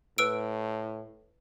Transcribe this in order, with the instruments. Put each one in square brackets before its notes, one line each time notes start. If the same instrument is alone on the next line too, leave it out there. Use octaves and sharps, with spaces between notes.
[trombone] A2 [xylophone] B4 E6 D7